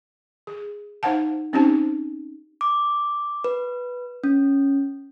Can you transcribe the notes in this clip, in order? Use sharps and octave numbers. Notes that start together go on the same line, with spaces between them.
G#4
D#4 C5 F5 F#5 A5
C4 C#4 D#4 G4 C5 A5
D6
B4
C#4